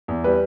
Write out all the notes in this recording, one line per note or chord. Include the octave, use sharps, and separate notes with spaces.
E2
G3 B4